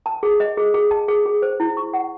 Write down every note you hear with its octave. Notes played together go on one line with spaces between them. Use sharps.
A5
G#4
D#5
G#4
G#4
A5
G#4
G#4
C5
E4
C#6
F#5